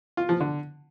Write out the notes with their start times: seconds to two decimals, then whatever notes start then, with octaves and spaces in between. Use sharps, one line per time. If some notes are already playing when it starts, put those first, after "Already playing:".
0.17 F4
0.29 F3
0.40 D3